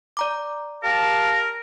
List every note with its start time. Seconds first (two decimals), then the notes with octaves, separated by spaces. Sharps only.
0.17 D5 A#5 D6
0.84 G4 A#4 F5 A5